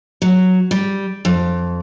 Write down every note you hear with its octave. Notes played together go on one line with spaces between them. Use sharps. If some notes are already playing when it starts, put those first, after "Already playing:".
F#3
G3
F2